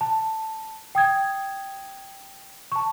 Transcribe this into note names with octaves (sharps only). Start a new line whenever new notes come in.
A5
G5 D#6 G#6
A5 C#6